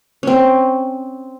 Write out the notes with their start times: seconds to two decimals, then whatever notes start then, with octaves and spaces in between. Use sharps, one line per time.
0.23 C4 C#4